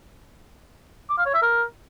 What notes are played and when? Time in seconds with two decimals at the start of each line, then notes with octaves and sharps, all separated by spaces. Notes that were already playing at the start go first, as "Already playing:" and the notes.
1.10 D6
1.18 F5
1.26 C#5
1.34 E5
1.42 A#4